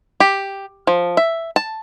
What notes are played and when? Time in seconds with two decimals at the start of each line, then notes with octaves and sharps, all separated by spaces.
0.20 G4
0.87 F3
1.17 E5
1.56 A5